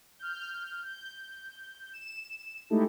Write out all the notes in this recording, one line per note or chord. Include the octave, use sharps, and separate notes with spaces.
F6 G6
G6
E7
G#3 A3 D#4 E4 G4 A4